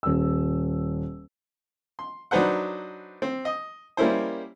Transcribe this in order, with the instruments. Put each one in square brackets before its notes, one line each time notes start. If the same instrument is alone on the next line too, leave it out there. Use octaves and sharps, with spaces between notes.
[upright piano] D#1 E6
[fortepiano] C6
F#3 D4 D#4 B4 C5 F#5
C4
D#5
G3 A#3 C#4 E4 C5